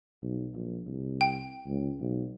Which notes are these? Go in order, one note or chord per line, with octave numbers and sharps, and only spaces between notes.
B1
A#1
C2
G5
C#2
B1